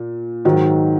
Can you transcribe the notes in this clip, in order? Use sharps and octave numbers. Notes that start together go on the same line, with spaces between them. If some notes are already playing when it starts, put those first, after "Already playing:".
Already playing: A#2
G#2 D#3 F#3